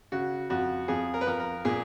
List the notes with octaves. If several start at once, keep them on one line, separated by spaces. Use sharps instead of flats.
C#3 F#4
F2 F#4
F2 G#4
A#4
B4
F2 A#4
A#4
A#2 G#4